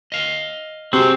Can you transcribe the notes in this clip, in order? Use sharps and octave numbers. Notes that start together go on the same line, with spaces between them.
D#5 F5
C3 C4 F#4 G#4